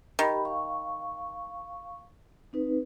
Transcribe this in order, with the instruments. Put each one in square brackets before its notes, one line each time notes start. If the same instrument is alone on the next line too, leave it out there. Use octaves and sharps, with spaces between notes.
[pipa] D#3 [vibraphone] G4 B5
[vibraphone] F5 C#6
C4 D#4 B4